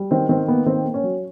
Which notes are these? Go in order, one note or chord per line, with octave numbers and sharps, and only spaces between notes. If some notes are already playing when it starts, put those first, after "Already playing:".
Already playing: G3
D#3 C4
D#3 C4
A#3 B3
D#3 C4
A#3
C#4
F#3